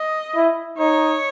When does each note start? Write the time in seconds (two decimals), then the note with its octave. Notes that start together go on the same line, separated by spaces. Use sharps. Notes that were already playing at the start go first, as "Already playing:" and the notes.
Already playing: D#5
0.36 E4
0.78 D#4 C#5